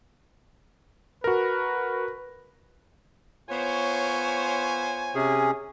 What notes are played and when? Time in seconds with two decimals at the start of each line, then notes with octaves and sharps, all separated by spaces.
1.24 F#4 A#4 B4
3.50 B3 F4 C5 C#5 G#5
5.15 C3 C#4 G#4